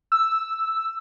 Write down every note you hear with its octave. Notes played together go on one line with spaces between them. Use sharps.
E6